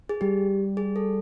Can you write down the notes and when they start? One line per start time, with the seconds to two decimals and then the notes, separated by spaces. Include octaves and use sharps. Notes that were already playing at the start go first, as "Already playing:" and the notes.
0.09 G#4
0.21 G3 G4
0.77 G#4
0.96 A4